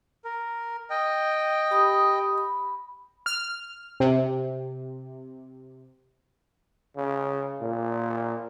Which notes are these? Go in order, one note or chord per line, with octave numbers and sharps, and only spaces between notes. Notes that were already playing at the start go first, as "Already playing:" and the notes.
A#4
D#5 G5
G4 B5 D#6
B5
F6
C3
C#3
A#2